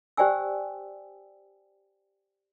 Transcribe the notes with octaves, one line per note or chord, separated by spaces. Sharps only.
G4 C5 D5 G5 G#5 E6